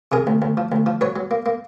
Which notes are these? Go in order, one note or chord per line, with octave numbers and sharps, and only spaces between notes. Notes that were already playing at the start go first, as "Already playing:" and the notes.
C3 G#4 A#4
D2
D2
F3
D2
F3
F#3 B4 C#5
F#3
A#3
A#3